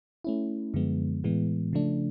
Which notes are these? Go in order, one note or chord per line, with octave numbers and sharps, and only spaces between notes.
A3 C#4 E4
F#2 D3 F3 G#3 B3
A2 E3 G#3 B3
C#3 F3 A3 D4